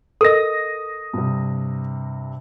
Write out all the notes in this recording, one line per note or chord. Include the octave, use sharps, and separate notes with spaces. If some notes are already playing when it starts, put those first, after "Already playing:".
A4 A#4 D#5 D#6 A#6
G2 C3